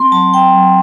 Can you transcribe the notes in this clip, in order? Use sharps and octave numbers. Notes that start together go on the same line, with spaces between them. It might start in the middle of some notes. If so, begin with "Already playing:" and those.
Already playing: C4 C6
F#3 A5
G5
F#3